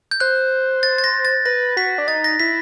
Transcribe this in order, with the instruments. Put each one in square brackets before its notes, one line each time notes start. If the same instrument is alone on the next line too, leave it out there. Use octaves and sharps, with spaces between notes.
[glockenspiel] G6
[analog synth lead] C5 [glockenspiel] F#6
[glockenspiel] A6
A6
A#6
A6
[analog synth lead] B4 [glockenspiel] A#6
[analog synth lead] F#4 [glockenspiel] B6
[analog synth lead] D4
[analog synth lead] D#4 [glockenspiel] A6
[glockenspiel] A#6
[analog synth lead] E4 [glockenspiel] B6